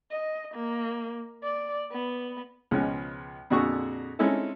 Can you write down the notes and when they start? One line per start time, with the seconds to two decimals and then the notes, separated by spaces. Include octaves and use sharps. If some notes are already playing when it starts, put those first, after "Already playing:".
0.11 D#5
0.55 A#3
1.43 D5
1.92 B3
2.71 C#2 B2 F3 G#3 C#4
3.50 F2 A#2 D3 F#4 G#4 C#6
4.19 G#3 C4 C#4 D#4 E4 A4